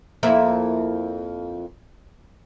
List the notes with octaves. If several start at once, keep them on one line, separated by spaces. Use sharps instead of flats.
F2 A#3 E4